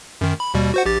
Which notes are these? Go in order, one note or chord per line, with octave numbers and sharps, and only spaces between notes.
F#2 D#3
B5
D#2 B2 G3
F#4 C5 F#5
A#1 G4 A6